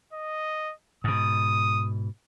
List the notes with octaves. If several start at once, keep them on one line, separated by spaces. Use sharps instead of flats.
D#5
G#2 B2 D#6